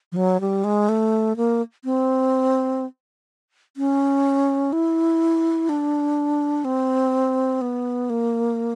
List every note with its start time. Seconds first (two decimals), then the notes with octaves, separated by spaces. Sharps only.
0.12 F3
0.16 F#3
0.41 G3
0.64 G#3
0.89 A3
1.37 A#3
1.84 C4
3.77 C#4
4.73 E4
5.69 D4
6.65 C4
7.61 B3
8.10 A#3